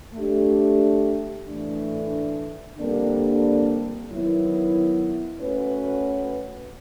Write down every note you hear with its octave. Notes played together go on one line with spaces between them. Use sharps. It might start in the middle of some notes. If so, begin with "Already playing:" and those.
A3 D4 G4
A2 E3 A3 D4
F2 D3 G3 A#3 D4
D#3 F#3 B3 E4
A3 C#4 F#4 B4